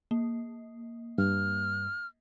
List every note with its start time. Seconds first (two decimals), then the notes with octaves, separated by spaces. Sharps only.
0.11 A#3
1.18 G2 F6